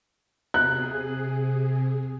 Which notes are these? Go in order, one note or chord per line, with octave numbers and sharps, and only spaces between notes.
C3 G#4 F#6